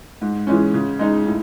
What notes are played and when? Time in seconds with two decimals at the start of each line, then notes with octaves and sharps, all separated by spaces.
0.21 G#2
0.47 E3 G#3 C#4
0.74 C#3
0.99 G#3 D#4
1.26 A2